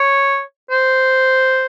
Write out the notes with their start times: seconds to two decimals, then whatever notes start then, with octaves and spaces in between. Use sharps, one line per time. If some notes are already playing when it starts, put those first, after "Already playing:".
Already playing: C#5
0.71 C5